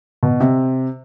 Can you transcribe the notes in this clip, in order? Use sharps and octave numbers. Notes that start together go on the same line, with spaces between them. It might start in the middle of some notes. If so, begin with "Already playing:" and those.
B2
C3